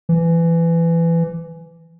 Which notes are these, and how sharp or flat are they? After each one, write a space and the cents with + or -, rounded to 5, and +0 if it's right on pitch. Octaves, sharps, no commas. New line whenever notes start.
E3 +20